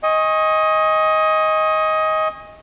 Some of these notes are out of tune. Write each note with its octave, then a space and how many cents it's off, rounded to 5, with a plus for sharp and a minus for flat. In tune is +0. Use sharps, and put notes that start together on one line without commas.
D#5 +15 G#5 -30 C#6 -25